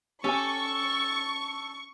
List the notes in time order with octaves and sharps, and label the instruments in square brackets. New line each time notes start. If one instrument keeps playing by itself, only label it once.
[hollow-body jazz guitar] C#4 [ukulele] G4 G#5 [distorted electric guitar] A4 [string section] C#6